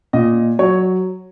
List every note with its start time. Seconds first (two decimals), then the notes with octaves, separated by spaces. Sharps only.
0.13 A#2 D#5
0.59 F#3 C#5